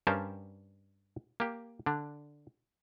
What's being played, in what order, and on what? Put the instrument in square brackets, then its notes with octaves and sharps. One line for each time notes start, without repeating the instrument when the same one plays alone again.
[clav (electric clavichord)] G2 G3 C#4 A#4 C5 A5
A#3 G4
D3 D4